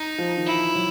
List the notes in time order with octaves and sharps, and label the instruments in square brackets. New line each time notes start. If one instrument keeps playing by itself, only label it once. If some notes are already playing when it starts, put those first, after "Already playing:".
Already playing: [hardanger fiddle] D#4
[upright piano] F3
D#3
[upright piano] E3 [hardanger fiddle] E4
[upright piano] F#3